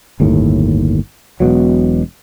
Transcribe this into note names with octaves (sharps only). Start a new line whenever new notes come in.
G1 D#2 A2
E1 B2 F#3